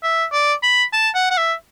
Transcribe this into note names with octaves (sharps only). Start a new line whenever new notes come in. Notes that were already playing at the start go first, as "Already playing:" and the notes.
E5
D5
B5
A5
F#5
F#5
E5